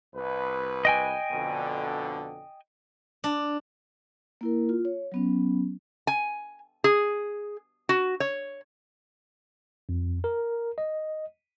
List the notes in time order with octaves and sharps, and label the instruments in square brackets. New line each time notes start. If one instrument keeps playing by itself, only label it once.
[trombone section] C2 B4
[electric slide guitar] D#5 G5 G#5
[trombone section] F2 B2 D3
[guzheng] D4
[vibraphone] A#3 E4 A#4
F4
C#5
F#3 B3 C#4
[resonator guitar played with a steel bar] G#5
G#4
F#4
C#5
[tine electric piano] F2
A#4
D#5